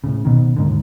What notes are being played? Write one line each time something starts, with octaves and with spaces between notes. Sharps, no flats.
A2 C#3
B2 D#3
D#2 G#2 D3